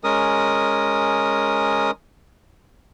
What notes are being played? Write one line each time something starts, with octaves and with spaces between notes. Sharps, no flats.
G#3 C#4 A#4 D#6